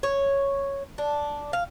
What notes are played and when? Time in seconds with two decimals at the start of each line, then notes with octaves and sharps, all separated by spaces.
0.03 C#5
0.98 D4
1.53 F5